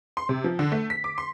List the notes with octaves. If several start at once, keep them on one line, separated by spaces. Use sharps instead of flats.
C6
C3
F3
D3
A3
B6
D6
C6